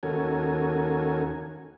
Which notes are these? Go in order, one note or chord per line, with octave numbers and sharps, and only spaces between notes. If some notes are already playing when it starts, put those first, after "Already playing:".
D#2 C#4 F#4 A4 A#4 G#5